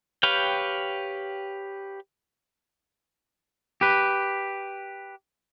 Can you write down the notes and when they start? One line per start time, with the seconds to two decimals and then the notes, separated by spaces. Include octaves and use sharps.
0.23 G4 B4 C#5 F5 G5
3.81 G4 B4